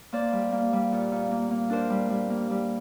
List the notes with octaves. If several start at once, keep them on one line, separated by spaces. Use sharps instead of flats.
A#3 C5 D5
G3
A#3
G3
A#2
A#2
A#3
A#3
D4 A#4 C5
G3
G3
A#3
G3